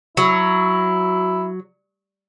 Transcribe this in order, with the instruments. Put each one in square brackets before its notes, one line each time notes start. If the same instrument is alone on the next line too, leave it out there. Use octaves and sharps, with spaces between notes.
[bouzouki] F#3 [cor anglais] E4